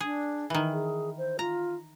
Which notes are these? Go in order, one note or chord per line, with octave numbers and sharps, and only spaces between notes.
D4 G#4
D#3 E3
G#4
C5
F4 A#5